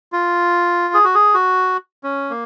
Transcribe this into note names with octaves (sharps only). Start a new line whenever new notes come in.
F4
G#4
F#4
G#4
F#4
C#4
A#3